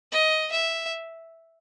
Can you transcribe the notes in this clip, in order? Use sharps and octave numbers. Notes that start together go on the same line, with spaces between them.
D#5
E5